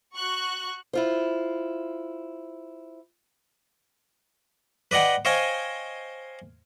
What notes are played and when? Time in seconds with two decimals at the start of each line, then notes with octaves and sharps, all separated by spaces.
0.15 F#4 C#6 F#6
0.93 E4 F4 C5
4.91 B4 D5 D#5 F#5 G5
5.25 C5 C#5 D#5 F5 G5 G#5